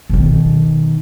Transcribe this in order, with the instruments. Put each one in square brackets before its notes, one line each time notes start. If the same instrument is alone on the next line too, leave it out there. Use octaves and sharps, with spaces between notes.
[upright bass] B2 D#3